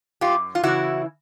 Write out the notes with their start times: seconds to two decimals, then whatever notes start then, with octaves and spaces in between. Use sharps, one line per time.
0.21 F#2 F4 G4
0.55 F4
0.63 C#3 E3 E4 F#4